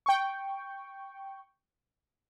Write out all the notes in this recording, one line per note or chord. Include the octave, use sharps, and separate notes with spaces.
G5 C#6